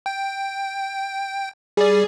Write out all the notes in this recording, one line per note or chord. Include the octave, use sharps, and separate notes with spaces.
G5
G3 G#4 D5